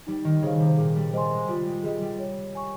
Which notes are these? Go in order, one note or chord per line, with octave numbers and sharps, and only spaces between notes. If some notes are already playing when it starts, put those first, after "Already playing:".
G3 D#4
D#3
C#3 G#4 C5 F5
C3
A#2 G#4
G3
G3 C5 D#5 G#5 C6
G#3
G3 F4
G#3
G3 G#4 D#5
G3
C#5
G#5 C#6